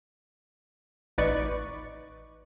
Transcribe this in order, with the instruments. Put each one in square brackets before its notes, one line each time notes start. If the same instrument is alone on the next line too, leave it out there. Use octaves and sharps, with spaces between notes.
[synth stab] A1 D#4 B4 D5 C#6